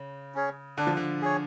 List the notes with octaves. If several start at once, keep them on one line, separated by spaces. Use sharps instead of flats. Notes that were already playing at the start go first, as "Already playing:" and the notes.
Already playing: C#3
C#4 G#4 C#5
D3 D4
F3
D3
G#4 C#5